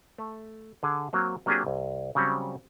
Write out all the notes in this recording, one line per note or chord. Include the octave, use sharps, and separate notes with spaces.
A3
D3 G#4
F#3 A#3 C4
F#3 A#3 C4 D4 G4 G#4
C2
C#3 F#3 G3 C4 C#4